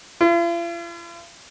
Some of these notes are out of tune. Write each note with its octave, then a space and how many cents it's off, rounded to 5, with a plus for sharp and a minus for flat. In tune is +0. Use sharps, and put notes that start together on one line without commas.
F4 -45